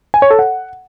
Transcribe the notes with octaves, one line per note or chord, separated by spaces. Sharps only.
G#5
C#5
A4
F#5